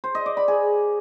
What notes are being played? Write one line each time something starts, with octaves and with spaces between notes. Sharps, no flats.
C5
D#5
D5
B5
G#4